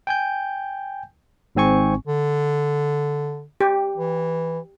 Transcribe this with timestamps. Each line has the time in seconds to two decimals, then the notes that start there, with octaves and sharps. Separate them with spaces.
0.07 G5 G#5 G6
1.55 G#1 G#2 C4 G#5 C#6
2.07 D3
3.61 G4
3.96 E3